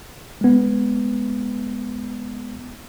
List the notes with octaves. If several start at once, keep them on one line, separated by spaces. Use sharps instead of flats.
G#3 B3